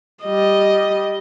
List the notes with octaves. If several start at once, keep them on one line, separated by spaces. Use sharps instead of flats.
G3 D#5